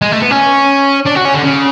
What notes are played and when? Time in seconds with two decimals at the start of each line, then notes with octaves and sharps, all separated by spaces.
0.02 G#3
0.12 A3
0.22 B3
0.31 C#4
1.06 D4
1.15 F#4
1.25 C#4
1.34 D3
1.43 C#3